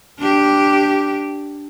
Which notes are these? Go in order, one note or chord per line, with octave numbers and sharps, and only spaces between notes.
D4 G4